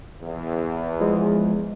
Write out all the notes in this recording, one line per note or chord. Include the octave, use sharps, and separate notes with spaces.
E2
F3 G#3